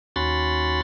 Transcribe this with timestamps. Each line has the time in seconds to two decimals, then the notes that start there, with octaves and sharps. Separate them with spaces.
0.16 D#2 C#4 F#4 B5 C6 A6